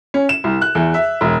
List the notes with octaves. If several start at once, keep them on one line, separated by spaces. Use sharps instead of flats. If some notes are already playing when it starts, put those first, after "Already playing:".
C#4
E7
C2
F#6
E2
E5
E1